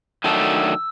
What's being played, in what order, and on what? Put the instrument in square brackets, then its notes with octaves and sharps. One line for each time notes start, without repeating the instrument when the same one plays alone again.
[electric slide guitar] D#3 F#3 A3 D4 [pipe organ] E6